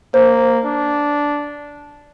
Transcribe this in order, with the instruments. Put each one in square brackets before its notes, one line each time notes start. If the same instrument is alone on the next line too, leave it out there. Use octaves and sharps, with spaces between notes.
[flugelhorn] A#3 [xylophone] C5
[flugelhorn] D4